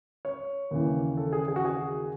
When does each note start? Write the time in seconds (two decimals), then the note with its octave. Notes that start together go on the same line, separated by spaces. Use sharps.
0.25 C#5
0.71 D#2 C#3 E3
1.17 A4
1.33 G#4
1.48 G#4
1.56 F#4
1.65 G#4